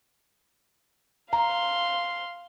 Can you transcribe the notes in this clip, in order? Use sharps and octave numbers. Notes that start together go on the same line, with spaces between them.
F5 A#5 C6